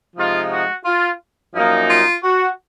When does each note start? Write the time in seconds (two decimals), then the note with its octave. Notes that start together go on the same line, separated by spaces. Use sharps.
0.16 C3 F3 G#3 D#4 F4
0.51 F#4
0.85 F4
1.54 F#2 F3 A#3 D#4
1.89 F4
2.23 F#4